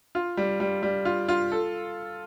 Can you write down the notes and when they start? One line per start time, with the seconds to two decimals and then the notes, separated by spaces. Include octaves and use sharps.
0.15 F4
0.37 G3
0.60 G3
0.83 G3
1.05 F4
1.29 F4
1.52 A4